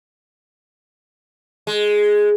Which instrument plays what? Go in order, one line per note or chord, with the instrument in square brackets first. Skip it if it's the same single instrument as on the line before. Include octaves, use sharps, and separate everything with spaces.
[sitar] G#3